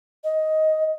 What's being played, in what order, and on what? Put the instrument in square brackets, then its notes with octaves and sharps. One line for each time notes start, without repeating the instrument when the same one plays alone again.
[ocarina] D#5